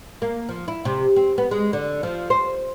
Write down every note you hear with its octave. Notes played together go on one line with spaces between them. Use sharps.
A#3
F3
E4
C3
C4
B3
G#3
D3
F3
C5